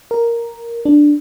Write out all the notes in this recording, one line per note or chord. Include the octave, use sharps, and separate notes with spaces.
A#4
D4